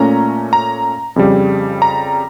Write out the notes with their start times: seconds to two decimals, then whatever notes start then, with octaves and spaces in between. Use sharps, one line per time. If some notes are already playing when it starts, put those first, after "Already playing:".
Already playing: A#2 A3 C#4 A#5
0.53 A#5
1.16 F2 C#3 G3
1.82 A#5